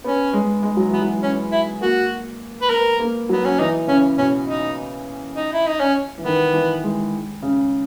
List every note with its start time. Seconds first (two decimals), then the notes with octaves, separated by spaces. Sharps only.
0.04 B3 C#4
0.33 G#3
0.63 G#3
0.77 F#3
0.88 E3
0.93 B3
1.02 F#3
1.23 C#4
1.52 E4
1.81 A#3 F#4
2.61 B4
2.69 B3 A#4
2.99 A#3
3.29 F#3 B3
3.45 C#4
3.59 E3 D#4
3.87 C#3 C#4
4.18 B2 C#4
4.47 D#4
5.35 D#4
5.53 E4
5.66 D#4
5.80 C#4
6.18 E3
6.23 D#3 B3
6.53 E3
6.84 G#3
7.42 C#3